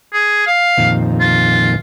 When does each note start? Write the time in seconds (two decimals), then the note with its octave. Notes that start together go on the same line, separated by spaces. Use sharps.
0.13 G#4
0.47 F5
0.78 F2 A#2 D#3
1.20 F4